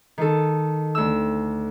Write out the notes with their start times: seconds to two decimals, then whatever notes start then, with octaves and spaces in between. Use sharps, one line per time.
0.18 D#3 A4
0.95 D2 E6